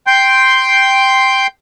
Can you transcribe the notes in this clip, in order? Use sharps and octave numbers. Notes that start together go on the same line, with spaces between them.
G5 C6 G6